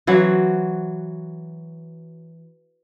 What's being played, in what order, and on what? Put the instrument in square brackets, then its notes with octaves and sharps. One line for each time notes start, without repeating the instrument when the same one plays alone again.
[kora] E3 F#3 F#4 C5